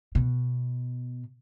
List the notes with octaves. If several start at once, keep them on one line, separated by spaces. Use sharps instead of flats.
B2